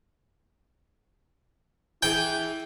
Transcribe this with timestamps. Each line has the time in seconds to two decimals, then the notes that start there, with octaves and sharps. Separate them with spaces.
2.03 E3 E4 G#4 G5